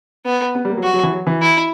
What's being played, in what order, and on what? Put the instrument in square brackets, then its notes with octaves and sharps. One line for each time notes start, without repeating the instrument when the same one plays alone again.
[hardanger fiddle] B3
[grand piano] B3
G3
A#3
F#3
[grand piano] G3 [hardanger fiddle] F#4
[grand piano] F#3
E3
F#3
E3
[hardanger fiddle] E4